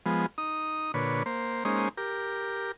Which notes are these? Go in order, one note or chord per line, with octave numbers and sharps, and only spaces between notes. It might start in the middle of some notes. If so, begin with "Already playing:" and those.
F3 G#3 B3
D#4 D#6
A#2 D3 B4 C#5
A#3 C5
G#3 A#3 C#4 D#4 C5
G4 A#4